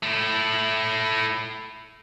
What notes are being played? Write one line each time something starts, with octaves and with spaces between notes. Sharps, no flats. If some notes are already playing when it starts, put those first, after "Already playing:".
A3 E4